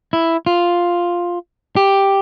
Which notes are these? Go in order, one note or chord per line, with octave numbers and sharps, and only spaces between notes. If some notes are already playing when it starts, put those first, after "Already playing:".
E4
F4
G4